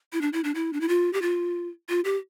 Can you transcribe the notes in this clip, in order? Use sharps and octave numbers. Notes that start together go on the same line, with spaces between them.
E4
D4
E4
D4
E4
D4
E4
F4
G4
F4
F4
G4